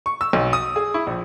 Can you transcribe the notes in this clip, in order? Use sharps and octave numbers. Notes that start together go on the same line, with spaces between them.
C#6
E6
B1
D#6
G#4
E4
A#1